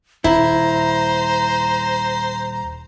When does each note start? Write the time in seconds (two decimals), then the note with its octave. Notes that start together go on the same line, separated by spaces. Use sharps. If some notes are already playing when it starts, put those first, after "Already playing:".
0.24 D#1 E4 C5 A#5